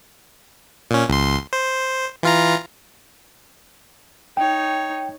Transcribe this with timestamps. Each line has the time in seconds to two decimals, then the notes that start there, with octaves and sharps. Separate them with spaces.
0.91 A#2 C#4
1.08 C#2 C6
1.53 C5
2.23 E3 F4 A#5
4.37 D#4 C#5 G5